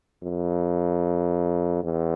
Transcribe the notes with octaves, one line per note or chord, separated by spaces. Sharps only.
F2
E2